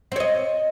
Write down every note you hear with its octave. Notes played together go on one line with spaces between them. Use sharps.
C4 C#5 D#5